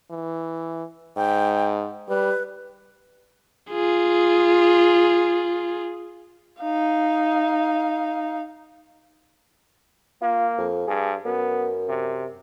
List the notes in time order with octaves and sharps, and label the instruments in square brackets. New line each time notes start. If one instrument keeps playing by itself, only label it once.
[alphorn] E3
[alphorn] G#2 [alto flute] G5
[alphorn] G3 [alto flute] B4
[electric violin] F4 G#4
[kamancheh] D#4 F5
[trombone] A#3 [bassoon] F4
[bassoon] F2
[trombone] G2 [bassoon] G#4
[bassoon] F#2 [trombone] B3
[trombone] C3